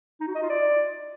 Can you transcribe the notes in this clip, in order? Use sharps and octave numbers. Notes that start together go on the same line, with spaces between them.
D#4
F#4
D#5
F4
D5